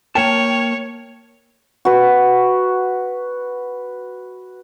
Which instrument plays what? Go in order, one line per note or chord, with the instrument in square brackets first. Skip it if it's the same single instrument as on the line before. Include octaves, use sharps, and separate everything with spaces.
[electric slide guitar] A#3 A#4 A5 [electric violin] C#5 [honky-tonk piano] G5
[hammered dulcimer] F#4 B4